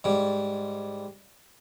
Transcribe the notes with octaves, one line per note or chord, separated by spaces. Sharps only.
G#2 G3